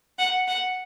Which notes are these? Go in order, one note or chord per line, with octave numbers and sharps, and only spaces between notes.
F#5
F#5